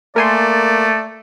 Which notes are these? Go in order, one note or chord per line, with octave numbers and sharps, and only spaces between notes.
A3 A#3 A#4 D5 G#5 C6